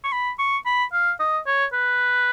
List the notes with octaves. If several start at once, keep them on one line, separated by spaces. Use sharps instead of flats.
C#6
B5
C#6
B5
F5
D#5
C#5
B4